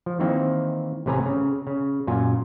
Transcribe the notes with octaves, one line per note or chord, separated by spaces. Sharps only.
F3
D#3 E3 A#3 C4
A1 C3 B4 G#5 A#5
C#3
C#3
F#2 A#2 F4 G#5